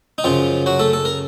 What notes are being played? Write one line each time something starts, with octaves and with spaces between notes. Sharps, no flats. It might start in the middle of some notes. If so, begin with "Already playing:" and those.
D#4
F#2 C#3 F3 F4
F#3 F#4
A3 A4
A4
A#4